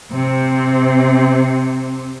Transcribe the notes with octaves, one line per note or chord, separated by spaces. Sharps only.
C3 C4